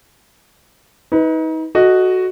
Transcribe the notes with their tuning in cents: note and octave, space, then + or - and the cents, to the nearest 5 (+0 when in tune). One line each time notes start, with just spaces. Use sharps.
D#4 +35 B4 +0
F#4 +0 A4 -20 D#5 +0